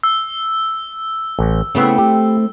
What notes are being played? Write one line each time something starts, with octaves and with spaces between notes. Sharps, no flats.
E6
A1
C#3 A3 B3 C4 E4
G4